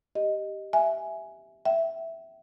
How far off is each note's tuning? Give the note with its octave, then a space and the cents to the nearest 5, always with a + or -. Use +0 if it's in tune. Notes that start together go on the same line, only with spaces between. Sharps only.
G4 +0 D#5 +0
E5 +0 G#5 +5
E5 +0 G5 -40